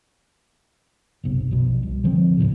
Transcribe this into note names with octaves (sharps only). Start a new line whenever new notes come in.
F#1 B1 C3
A#1 B2
C2
D3 F3 G3 C4
D#1 B1 A2 C#3